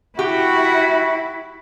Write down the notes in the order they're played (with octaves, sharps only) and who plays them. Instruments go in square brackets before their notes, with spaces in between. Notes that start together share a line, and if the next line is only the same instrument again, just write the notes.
[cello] E4 [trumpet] F#4 [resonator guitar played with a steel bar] G4